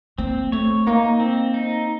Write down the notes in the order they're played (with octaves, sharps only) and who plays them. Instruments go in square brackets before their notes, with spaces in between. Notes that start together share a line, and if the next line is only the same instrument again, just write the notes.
[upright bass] A#3 [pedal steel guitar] C4
[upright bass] A3 [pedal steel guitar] C#5
[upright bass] A#3 [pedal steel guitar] D#4
[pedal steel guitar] C4
D#4